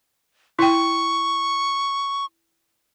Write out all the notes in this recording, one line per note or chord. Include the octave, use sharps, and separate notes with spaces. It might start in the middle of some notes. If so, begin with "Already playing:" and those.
E4 G5 C#6